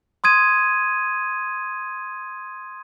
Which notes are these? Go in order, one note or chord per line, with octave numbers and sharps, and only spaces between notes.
C6 D#6 G#6 D#7